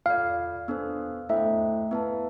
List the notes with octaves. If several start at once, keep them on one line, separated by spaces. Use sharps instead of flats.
F4 A4 D5 F5
B3 D4 A4 C5
A3 E4 A4 C5 E5 G5
B3 E4 B4 F5 A5